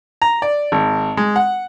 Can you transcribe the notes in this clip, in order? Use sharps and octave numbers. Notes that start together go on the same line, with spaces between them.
A#5
D5
G#1
G#3
F#5